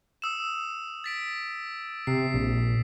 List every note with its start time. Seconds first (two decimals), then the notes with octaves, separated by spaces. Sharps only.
0.22 D#6 E6 E7
1.04 A6 B6 D7
2.07 C3 C7
2.34 A#1